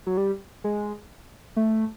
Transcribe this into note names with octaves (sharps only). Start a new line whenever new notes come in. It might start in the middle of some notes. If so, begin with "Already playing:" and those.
F#3
G3
G#3
A3